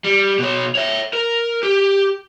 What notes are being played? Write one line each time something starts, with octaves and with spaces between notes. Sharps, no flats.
G3
B2 C#5
C#5 E5
A#4
G4